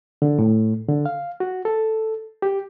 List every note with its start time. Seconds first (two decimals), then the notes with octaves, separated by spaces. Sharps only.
0.22 D3
0.39 A2
0.88 D3
1.06 F5
1.40 F#4
1.65 A4
2.42 G4